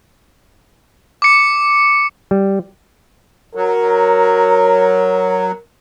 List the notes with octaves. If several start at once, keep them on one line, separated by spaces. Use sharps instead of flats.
D6 C#7
G3
F#3 A#4